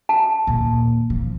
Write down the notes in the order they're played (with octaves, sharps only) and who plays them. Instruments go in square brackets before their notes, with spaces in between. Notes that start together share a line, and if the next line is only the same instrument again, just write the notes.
[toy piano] A5
[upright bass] D#2 A#2
F3